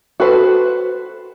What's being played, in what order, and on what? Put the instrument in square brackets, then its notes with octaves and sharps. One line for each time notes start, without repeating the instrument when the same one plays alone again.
[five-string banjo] F#4 A4 B4 C5